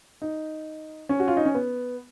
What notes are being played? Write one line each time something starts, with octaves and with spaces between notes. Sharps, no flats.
D#4
C#4
F#4
F4
D#4
C#4
B3